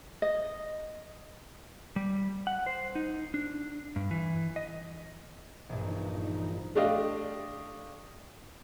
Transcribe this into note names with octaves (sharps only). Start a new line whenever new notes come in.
D#5
G3
F#5
C5
D#4
D4
G2
E3
D#5
A#1 G2 E3 D#4
A3 D4 G4 D5 D#5 F5